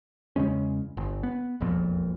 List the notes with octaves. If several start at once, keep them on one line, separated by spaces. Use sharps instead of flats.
E2 C#3 G#3 C#4
G1
B3
E1 A#1 F2 A#2